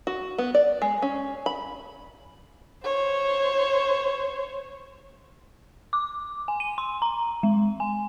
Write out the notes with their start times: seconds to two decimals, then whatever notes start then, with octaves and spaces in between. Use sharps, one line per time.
0.07 F#4
0.38 B3
0.54 D5
0.82 G#3
1.02 C#4
1.46 B5
2.84 C5 C#5
5.93 D6
6.48 G#5
6.60 D#7
6.78 C6
7.02 A#5
7.43 G#3
7.80 G#5